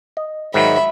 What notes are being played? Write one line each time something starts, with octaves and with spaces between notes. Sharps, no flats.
D#5
G#2 D#3 F#3 E5 B5